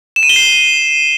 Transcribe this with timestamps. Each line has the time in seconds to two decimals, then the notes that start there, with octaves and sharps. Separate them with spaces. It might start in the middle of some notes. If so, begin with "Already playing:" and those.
0.16 E7
0.23 D#7
0.29 G7
0.36 C7